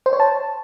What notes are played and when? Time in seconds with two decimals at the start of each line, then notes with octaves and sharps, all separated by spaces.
0.06 C5
0.13 C#5
0.20 A5